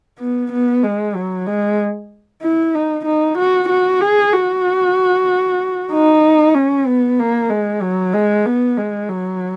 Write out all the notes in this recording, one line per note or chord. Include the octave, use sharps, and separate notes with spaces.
B3
B3
G#3
F#3
G#3
E4
D#4
D#4
F#4
F#4
G#4
F#4
D#4
C#4
B3
A#3
G#3
F#3
G#3
B3
G#3
F#3